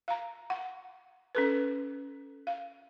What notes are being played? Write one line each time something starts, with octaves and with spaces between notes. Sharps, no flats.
F5 A#5
F#5
C#4 A4 B4
F5